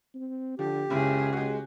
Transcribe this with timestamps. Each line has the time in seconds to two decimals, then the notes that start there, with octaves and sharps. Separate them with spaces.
0.15 C4
0.59 D3 F3 G4
0.90 F#1 C#2 C#3 E4 G#4 E5
1.33 G#3 F#4 G4